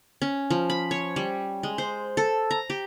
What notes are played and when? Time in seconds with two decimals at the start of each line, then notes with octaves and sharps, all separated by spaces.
0.22 C#4
0.50 F3
0.70 B5
0.91 C#5
1.16 G3
1.63 G#3
1.78 C5
2.17 A4
2.51 A#5
2.70 G4